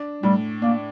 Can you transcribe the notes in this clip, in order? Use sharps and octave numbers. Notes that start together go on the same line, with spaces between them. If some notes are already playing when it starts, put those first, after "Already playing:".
Already playing: D4
A2 G3
A#3 D4